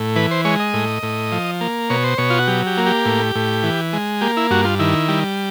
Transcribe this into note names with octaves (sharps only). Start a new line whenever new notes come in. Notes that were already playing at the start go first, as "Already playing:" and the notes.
Already playing: A2
E3 B4
C5
G#3 C#5
D#5
A2
A2
F3
A#3
B2 C#5
C5
B2 C#5
F4
F#4
F#3 G4
G4
A#3
G4
A2
A2
E3
G#3
A#3 G4
E4
G2 F#4
F4
D#3 E4
G3